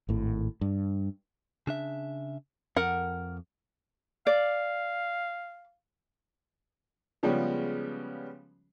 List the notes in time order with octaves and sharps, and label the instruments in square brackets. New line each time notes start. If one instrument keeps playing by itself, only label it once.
[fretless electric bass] G#1 A2
G2
[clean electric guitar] C#3 D4 E5
[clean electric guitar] F2 [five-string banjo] A#4 F#5
[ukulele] D5 [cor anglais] F5
[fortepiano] C#3 F3 G3 G#3 B3 C#4